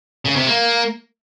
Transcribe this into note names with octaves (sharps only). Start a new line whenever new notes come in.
C#3
C3
A#3